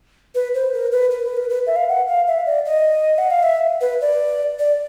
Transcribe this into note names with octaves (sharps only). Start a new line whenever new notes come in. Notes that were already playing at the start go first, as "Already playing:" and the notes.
B4
C5
A#4
B4
A#4
B4
A#4
B4
E5
F5
F#5
F5
E5
D5
D#5
F#5
F5
E5
B4
D5
D5